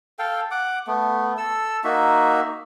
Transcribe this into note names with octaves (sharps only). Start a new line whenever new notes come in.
A4 F5 G5
F#5 D6
A3 B3
A4 E6
A#3 D#4 F#4 E5